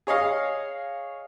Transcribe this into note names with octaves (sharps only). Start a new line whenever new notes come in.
G#4 C#5 D#5 F5